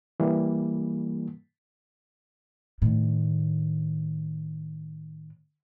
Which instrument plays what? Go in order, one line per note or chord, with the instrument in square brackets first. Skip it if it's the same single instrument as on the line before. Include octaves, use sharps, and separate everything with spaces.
[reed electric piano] E3 G3 A#3
[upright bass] A2 D#3